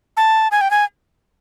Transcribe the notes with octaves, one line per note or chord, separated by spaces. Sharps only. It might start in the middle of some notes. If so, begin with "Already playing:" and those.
A5
G#5
G5
G#5